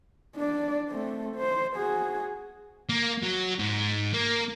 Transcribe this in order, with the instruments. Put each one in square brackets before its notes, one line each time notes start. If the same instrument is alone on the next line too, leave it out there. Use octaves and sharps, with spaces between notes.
[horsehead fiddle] D4 D5
A3 C4
C5
F#4 G#4
[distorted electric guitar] A#3
F#3
G#2
A#3